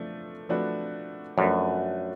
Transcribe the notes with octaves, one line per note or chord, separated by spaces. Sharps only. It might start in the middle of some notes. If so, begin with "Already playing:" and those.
Already playing: F3 A3 D4
F3 A3 D4 F#4 B4
F#2 F3 A3 D4 F#4 B4